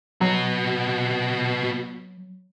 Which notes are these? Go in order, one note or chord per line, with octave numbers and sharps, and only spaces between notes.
F#3 B3 F#4